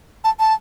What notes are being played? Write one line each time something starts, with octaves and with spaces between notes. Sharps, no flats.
A5
A5